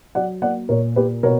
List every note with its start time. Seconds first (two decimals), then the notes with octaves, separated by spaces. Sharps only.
0.15 F#3 D5 F#5
0.42 A#3 D5 F#5
0.69 A#2 A#4 C#5
0.96 A#3 G4 B4
1.23 B2 A#4 C#5